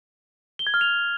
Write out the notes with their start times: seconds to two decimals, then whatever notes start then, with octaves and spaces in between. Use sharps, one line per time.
0.59 G7
0.67 G#6
0.74 F6
0.81 F7